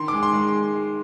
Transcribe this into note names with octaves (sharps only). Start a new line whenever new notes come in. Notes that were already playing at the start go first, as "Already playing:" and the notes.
Already playing: D#3 C6
G#3 D6
C6
G#3
C6